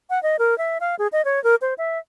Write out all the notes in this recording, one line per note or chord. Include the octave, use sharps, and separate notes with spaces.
F#5
D#5
A#4
E5
F5
G#4
D#5
C#5
A#4
C5
E5